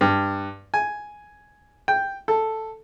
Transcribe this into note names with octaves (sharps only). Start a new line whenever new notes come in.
G2
G#5
G5
A4